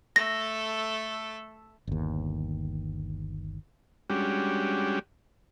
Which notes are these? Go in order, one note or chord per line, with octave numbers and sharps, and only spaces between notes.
A3 A4 A#6
G1 D#2
G3 G#3 C#4 D4 F#4 G4